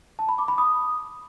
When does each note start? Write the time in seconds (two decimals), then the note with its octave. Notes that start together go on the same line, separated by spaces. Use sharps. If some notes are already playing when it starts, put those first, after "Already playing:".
0.19 A5
0.29 B5
0.38 D6
0.48 B5
0.58 D#6